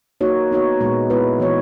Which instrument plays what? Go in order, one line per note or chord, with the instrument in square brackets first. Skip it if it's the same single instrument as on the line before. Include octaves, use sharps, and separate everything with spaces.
[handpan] A#3 D#4 F#4 C#5
B3 D#4 F#4 C#5
A#2 G#3 B3
G#3 B3 E4 B4
E3 B3 F#4 C#5